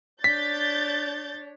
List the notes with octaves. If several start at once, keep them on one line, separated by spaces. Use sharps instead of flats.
D4 C#5 G6 A6 B6